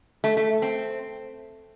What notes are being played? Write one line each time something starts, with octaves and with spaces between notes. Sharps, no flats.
A3
A3
C4